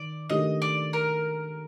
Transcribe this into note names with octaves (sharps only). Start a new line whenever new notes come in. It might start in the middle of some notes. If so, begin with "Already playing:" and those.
Already playing: D#3 D5
D#3 A3 D4 G4 D#5
D5
A#4